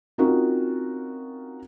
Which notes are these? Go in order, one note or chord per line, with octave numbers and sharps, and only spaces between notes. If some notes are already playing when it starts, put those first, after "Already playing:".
C4 C#4 D#4 F4 F#4 A#4